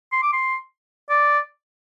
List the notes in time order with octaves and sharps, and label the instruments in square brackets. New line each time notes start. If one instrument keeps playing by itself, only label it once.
[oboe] C6
D6
C6
D5